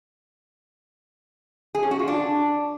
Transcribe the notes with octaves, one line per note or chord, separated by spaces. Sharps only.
G#4
C#4
F#4
F4
D4